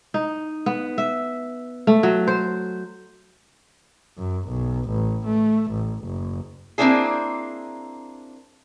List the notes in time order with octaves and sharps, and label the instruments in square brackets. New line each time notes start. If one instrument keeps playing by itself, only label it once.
[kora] D#4
B3
E5
A3
F#3
C5
[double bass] F#2
B1
A1
A3
A1
F#1
[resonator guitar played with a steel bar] A#3 C4 D4 E4 G#4